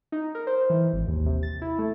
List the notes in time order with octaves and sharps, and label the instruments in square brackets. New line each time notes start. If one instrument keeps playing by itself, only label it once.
[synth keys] D#4
A#4
C5
E3
G#1
D#2
C3
A6
E4
A3